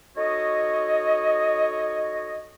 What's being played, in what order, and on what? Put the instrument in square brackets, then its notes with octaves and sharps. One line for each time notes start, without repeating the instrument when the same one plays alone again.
[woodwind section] D#4 F#4 A4 C#5 D#5